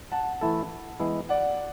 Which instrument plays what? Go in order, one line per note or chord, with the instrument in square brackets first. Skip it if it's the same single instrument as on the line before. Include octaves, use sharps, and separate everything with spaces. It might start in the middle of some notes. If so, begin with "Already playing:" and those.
[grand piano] F#5 A5
[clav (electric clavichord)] E3 A3 E4 A4
E3 G#3 B3 E4
[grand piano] D5 F#5